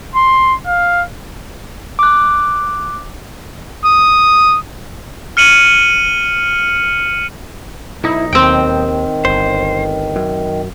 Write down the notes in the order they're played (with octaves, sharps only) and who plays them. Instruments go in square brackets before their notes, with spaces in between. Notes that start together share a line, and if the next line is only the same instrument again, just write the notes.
[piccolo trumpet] C6
F5
[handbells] D6 F#6
[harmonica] D#6
[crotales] F6 C#7 D#7 F#7
[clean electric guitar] B1 D#4 [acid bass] E4
[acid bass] D#2 [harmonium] D#3 [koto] C4 G5
[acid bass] G1 [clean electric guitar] C5
[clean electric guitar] F#2